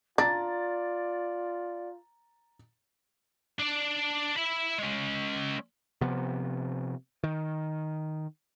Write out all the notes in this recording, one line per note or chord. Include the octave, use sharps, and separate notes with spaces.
D4 F4 D5 A#5 A6
D4 D5
E5 B5
G#3 C#4
C3 F3 B3
D#3